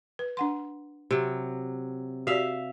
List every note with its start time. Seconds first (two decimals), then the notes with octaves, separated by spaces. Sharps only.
0.19 B4
0.37 D4 F#5 C6
1.11 C3 F#3
2.27 F#4 G4 D5 E5 F5